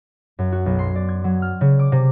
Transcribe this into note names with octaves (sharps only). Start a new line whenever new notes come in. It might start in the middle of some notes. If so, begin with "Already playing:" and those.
F#2
F#4
B1
C6
D5
G#6
F#3
F6
C#3
D6
C3